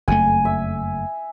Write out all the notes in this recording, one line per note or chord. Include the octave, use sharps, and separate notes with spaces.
F#1 F2 A3 G#5
E5